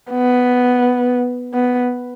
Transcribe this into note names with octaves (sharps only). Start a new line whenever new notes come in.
B3
B3